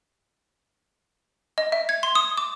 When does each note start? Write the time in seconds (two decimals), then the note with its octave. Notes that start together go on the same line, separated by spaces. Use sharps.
1.58 D#5
1.72 E5
1.89 G#6
2.03 C6
2.15 D#6
2.37 D6